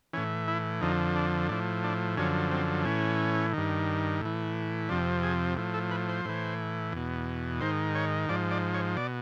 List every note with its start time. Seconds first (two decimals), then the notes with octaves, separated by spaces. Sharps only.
0.13 A2 E3 C#4
0.48 E4
0.81 F2 D3 F3 D#4
1.16 D4
1.49 A2 F3 D4
1.84 D4
2.17 F#2 D3 F3 C#4
2.52 C4
2.85 A2 E3 C#4
3.53 G2 D#3
4.21 A2 E3
4.89 F2 C3 F3 D4
5.23 G#4
5.57 A2 F3
5.74 A4
5.91 B4
6.09 C5
6.25 A2 E3
6.92 E2 B2
7.60 G#2 D#3 C5
7.95 C#5
8.29 G#2 F3 D5
8.51 D5
8.74 C#5
8.97 B2 D5